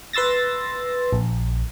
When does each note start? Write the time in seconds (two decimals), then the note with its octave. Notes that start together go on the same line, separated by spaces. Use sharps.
0.13 B4 C6 E6 A6 A#6
1.12 A#1